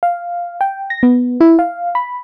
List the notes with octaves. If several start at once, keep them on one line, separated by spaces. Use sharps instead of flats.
F5
G5
A#6
B3
E4
F5
B5